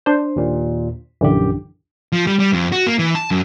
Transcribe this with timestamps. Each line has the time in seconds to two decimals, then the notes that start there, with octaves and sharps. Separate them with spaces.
0.06 D4 C5
0.36 D#2 A#2
1.21 A#1 F#2 D3 E3 G4
2.12 F3
2.27 G3
2.39 G3
2.53 F2
2.72 F#4
2.86 A#3
2.99 E3
3.15 A5
3.31 F#2